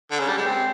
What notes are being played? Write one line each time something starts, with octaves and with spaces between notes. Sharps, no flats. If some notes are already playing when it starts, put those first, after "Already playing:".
D3
C#3
G3
G#3
C4